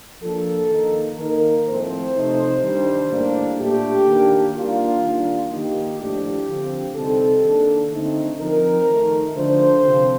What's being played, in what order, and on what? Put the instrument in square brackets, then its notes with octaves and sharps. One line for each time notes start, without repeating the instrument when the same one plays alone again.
[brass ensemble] F3 A#3 D4 A4
D#3 A#3 D#4
D#3 A#3 D#4 A#4
A2 F3 A3 C4 C5
C3 F3 A3 D#4
D#3 G3 D4
A2 G3 A#3 D4
A#2 A3 D4 G4
D#3 A#3 D4
D#3 G3 A#3 D4 F4
D#3 G3 A#3 D4
D#3 A#3 D#4 G4
A2 F3 A3 D4 G4
D3 F3 C4
C3 G3 C4 D#4 A4
D#3 A#3 D4
D3 A3 C4 D#4
F3 C4 D#4 A#4
D#3 A3 D#4
D3 F3 A3 D4 C5
C3 F3 C4